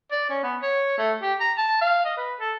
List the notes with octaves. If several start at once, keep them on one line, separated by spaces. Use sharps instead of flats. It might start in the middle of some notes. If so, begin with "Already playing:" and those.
D5
C#4
B3
C#5
A3
G4
A#5
A5
F5
D#5
B4
A4